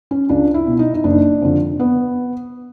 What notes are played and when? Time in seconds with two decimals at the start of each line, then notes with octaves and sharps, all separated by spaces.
0.11 C#4
0.29 C#2 D4
0.54 E4
0.67 B2
0.79 D#4
0.94 D#4
1.04 F#1 D4
1.42 F2 D3
1.79 B3